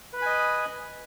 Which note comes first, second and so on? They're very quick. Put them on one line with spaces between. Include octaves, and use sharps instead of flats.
B4 B5 G#5 D#5